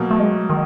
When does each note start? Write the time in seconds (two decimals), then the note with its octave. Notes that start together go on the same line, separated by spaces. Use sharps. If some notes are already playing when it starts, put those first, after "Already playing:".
Already playing: B2 F#3 A#3
0.11 A3
0.19 G#3
0.50 D#3